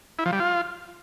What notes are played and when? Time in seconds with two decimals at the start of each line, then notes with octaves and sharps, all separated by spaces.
0.19 E4
0.26 F3
0.33 G3
0.40 F4